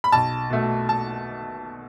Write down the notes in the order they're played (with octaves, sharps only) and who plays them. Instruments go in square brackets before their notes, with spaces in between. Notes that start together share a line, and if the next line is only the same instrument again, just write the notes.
[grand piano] B5
B1 A5
B2 A3
A5